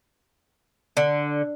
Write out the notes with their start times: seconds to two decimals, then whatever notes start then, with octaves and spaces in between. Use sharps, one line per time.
0.97 D3